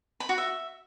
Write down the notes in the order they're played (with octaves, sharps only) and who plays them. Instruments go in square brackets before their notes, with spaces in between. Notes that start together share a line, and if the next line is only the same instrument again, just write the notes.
[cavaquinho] B5
F#4
E5